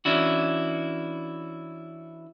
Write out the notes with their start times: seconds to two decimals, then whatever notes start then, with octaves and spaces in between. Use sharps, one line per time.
0.05 E3 C#4 D4 E4 F#4